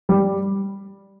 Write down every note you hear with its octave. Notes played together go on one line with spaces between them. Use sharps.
G3